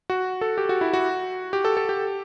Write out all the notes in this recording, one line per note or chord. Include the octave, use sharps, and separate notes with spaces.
F#4
A4
G4
F#4
E4
F#4
G4
A4
A4
G4